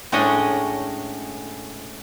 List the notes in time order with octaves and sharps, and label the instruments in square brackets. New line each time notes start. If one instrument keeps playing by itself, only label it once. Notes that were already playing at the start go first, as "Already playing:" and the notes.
[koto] A2 G#3 C#4 D4 D#5